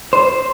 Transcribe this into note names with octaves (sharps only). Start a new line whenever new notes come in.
C5